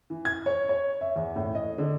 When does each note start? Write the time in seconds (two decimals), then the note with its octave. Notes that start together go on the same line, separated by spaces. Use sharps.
0.10 E3
0.25 G#6
0.46 C#5
0.69 C#5
1.01 E5
1.16 E2
1.36 A2
1.55 D#5
1.78 D3